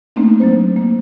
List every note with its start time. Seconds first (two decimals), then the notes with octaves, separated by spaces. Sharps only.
0.16 A3 A#3 C4 D4 D#4
0.40 F#3 A#3 C5
0.76 A#3